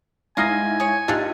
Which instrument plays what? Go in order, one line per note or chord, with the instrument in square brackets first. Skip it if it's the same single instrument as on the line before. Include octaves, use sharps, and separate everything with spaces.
[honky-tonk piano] G#2 E4 A#6 [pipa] D#5 F5 A#5 [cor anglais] G#5
[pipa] G#4 C#5
[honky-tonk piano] A#1 D#4 G4 [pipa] D4 F4 A4